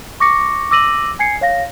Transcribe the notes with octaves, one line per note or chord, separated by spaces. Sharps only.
C#6 D6 A#6 C#7
D6 E6 A#6 D#7 F#7
G#5 G#6 C7 C#7
C#5 F5 A#6